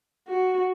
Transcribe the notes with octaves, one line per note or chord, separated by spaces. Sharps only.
F#4